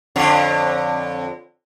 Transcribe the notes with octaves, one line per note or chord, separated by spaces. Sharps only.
F2 D3 C#5